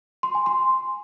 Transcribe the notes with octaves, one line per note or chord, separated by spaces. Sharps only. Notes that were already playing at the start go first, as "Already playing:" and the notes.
C6
G#5
C6